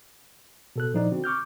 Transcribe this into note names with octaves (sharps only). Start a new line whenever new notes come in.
B2 A4 F#6
A#2 F3 D#4 D5
D3 C4 F#4
C#6 D6 F6 G6